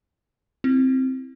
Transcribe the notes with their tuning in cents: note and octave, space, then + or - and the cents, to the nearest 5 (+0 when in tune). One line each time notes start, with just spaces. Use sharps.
C4 +0 E4 +0